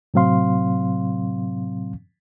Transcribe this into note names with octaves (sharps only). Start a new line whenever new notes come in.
A2 C3 F#3 C4 F5 C6